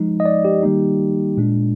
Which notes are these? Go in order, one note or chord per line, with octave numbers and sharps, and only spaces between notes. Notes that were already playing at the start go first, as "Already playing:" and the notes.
Already playing: F3 G#3 D#4
D#5
D5
G4
D#3 G3 A#3 D#4
A#2 G#3 D4